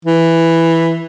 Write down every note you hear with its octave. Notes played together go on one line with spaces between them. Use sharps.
E3